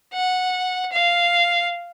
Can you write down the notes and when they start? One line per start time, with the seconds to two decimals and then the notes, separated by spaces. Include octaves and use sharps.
0.13 F#5
0.92 F5